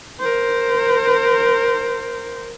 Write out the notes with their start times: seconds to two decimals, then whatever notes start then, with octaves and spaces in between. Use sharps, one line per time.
0.20 A#4 C5